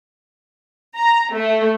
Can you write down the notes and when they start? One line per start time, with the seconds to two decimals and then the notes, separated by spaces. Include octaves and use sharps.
0.97 A#5
1.34 A3